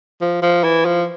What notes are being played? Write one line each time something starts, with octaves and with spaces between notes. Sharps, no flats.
F3
F3
E3
F3